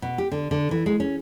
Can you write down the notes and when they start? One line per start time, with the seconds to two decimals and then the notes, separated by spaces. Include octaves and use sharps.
0.02 B2
0.18 G4
0.32 D3
0.51 D3
0.71 E3
0.86 G#3
1.00 C#4